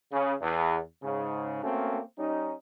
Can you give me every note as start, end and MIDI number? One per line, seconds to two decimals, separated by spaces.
0.12 0.33 49
0.41 0.78 40
1.03 1.60 44
1.03 1.60 49
1.63 1.99 57
1.63 1.99 58
1.63 1.99 60
1.63 1.99 61
1.63 1.99 66
2.18 2.52 55
2.18 2.52 61
2.18 2.52 63